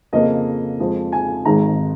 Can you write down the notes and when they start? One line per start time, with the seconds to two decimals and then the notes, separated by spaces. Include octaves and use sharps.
0.13 F2 C#3 A#3 D#5
0.79 F2 F3 G#3
1.12 G#5
1.45 G#1 G#2 D#3 G#3 A#5